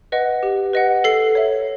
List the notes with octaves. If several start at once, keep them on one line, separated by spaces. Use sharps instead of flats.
B4 D#5 F#5
G4
B4 D#5 F#5
A4 C7
C#5 E5